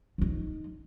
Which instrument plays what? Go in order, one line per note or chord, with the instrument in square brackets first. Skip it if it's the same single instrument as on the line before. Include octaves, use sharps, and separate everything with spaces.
[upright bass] F3 D#4